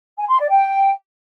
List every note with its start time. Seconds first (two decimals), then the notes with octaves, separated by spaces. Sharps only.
0.18 G#5
0.28 C6
0.39 D5
0.49 G5